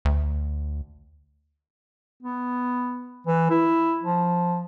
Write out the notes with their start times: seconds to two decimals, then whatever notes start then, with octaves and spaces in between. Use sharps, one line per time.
0.05 D2
2.23 B3
3.27 E3
3.50 E4
4.03 F3